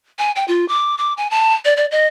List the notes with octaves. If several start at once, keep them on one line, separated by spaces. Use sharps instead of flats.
G#5
G5
F4
D6
D6
G#5
A5
D5
D5
D#5